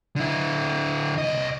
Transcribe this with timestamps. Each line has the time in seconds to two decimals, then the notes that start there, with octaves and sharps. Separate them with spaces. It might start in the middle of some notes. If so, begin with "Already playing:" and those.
0.16 D3 E4
1.18 C2 D#5